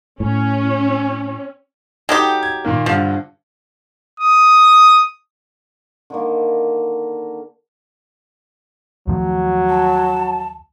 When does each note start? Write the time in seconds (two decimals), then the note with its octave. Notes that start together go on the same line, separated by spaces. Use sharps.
0.20 A2 C#4
2.09 F#3 D#4 G4 A4 G5
2.43 G#6
2.65 A#2 D#3 A#3
2.86 G2 D3 F3
4.20 D#6
6.10 D3 D#3 A#3
9.08 D#2 F3 F#3 A3
9.70 A5